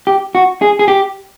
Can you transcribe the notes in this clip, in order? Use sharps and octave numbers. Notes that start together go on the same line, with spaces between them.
G4
F#4
G#4
G#4
G4